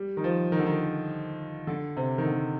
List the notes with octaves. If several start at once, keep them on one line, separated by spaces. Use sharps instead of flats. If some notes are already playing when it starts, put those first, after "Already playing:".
Already playing: G3
D#3
F3
D#3
D3
D#3
D3
C3
D#3
D3